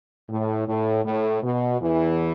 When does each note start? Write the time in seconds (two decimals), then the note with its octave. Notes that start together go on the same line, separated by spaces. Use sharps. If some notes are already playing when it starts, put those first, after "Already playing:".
0.29 A2
0.67 A2
1.05 A2
1.43 B2
1.80 E2 E3